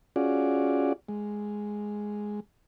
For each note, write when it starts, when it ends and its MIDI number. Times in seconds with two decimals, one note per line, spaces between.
0.16 0.93 61
0.16 0.93 65
0.16 0.93 66
0.16 0.93 68
0.16 0.93 74
1.08 2.40 56